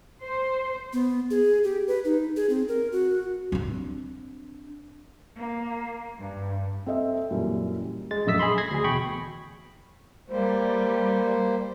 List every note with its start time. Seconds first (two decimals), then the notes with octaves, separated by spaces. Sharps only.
0.22 C5
0.93 B3
1.31 G#4
1.64 G4
1.88 B4
2.05 D#4
2.36 G#4
2.49 C4
2.68 A#4
2.92 F#4
3.52 C4 D4
5.36 A#3
6.18 G2
6.86 C4 A4 D#5 E5
7.30 F#2 A#2 E3 G3
8.11 G#3 A6
8.26 A#1 F#2 A3 D#5 E6 B6
8.39 G#4 D#5 B5 C6
8.58 G#6 A#6 C7
8.71 D2 G#4
8.84 E2 B2 G5 B5 C#6
10.30 G3 A#3 C5